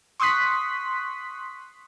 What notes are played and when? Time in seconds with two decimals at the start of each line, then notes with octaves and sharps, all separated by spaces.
0.20 C6 C#6 D#6 F#6 B6